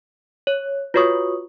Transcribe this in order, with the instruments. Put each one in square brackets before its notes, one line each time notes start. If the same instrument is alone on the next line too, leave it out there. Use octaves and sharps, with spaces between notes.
[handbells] C#5
[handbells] F4 F#4 C#6 [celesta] B4 C#5 D#6